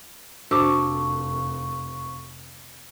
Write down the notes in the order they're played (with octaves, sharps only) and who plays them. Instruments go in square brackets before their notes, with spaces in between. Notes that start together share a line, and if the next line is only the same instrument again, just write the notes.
[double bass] F1 [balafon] D4 F#4 C5 [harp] A4 D6 [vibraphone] C#6